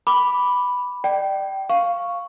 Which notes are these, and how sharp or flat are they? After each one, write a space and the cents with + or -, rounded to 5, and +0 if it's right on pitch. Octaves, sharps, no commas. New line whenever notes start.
B5 +0 D6 +0
D5 +30 G5 -20
F5 +0 C#6 +0